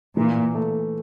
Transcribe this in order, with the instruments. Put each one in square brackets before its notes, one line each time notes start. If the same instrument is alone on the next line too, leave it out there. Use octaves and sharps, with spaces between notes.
[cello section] A#2 [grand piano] E3
[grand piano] A3